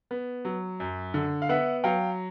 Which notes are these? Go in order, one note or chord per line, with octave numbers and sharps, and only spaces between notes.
B3
F#3
F#2
D3
F5
B3 E5 F#5
F#3 F5 G5